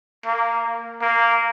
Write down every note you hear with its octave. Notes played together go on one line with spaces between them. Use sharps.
A#3
A#3